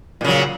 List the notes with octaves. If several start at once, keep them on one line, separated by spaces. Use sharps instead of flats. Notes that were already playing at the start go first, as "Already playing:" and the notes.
A#2 C#3 F#3